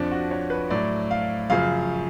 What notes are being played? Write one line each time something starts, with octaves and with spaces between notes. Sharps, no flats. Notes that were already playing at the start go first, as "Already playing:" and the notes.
Already playing: F2 F3 D4
F#4
C#5
B4
A2 F#3 D5
F5
F#2 C#3 F3 F5